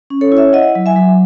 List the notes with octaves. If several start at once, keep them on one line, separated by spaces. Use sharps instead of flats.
C#4
A4 C#5
E4
C#5 E5
E4 D#5 F#5
F#3
E5 G#5
F#3